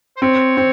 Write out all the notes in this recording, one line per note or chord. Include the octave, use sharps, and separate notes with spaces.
C5
C4 C#5
C4